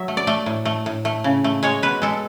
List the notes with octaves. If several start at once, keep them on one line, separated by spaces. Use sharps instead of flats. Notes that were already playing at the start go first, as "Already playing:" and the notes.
Already playing: F#3 E5
A3
D5
A3
A2
A3
A2
A3
C#3
A3
G#3 C#5
B2 B4
G#3 A4